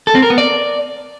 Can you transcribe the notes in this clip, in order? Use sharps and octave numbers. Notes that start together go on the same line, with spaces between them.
A4
C4
A#4
B3
D5